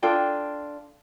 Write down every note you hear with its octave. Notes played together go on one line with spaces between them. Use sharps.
D4 F4 A4 G5